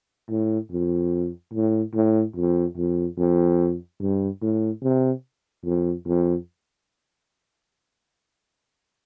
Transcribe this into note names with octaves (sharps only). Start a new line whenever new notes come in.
A2
F2
A2
A2
F2
F2
F2
G2
A2
C3
F2
F2